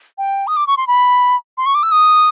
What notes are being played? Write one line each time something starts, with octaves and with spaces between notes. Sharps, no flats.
G5
D#6
D6
C#6
C6
B5
C6
C#6
D6
E6
D#6